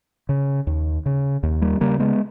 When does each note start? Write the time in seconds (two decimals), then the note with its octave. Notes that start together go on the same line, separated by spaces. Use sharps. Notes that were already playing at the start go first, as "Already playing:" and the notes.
0.29 C#3
0.67 D#2
1.06 C#3
1.43 D#2
1.62 G3 A#3
1.81 C#3 G3 A#3
2.00 G#3 B3